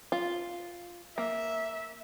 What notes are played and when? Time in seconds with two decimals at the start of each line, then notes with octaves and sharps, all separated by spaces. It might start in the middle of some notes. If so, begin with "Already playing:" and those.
0.12 F4
1.18 A#3 E5